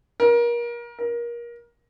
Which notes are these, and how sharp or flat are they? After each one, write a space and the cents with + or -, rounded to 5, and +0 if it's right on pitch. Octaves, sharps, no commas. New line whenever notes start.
A#4 +30
A#4 +25